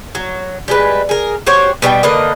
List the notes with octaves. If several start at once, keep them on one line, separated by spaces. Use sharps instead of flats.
F#3
G3 G#3 B4
G#4 A#4
F#4 G4 C5 C#5
B2 G3 F#4 G5
D3 A#3 B4 D#5